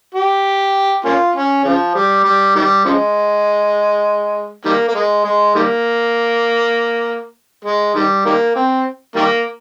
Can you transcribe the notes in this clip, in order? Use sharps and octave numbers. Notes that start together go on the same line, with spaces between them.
G4
A#3 C#4 F4
C#4
C#3 F3
G3
G3
D#3 G3
C#3 F3 G#3
D#3 G3 A#3
A#3
G#3
G#3
D#3 G3 A#3
G#3
D#3 G3
D#3 G3 A#3
C4
D#3 G3 A#3